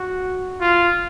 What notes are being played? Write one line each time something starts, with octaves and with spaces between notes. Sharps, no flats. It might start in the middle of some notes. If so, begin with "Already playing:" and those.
Already playing: F#4
F4